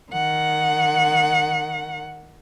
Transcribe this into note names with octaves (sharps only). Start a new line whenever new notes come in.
D#3 F#5